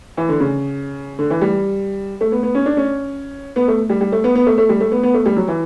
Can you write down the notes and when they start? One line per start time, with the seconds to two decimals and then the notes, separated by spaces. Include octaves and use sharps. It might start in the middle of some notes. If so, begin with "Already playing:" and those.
0.17 E3
0.29 D3
0.40 C#3
1.19 D3
1.30 E3
1.41 G3
2.21 A3
2.32 B3
2.43 B3
2.55 C#4
2.66 D4
2.77 C#4
3.56 B3
3.68 A3
3.90 G3
4.01 G3
4.12 A3
4.24 B3
4.35 B3
4.46 A3
4.58 A3
4.69 G3
4.80 A3
4.92 B3
5.03 B3
5.14 A3
5.26 G3
5.37 F#3
5.48 E3